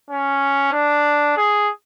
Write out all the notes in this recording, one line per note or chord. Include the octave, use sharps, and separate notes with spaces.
C#4
D4
G#4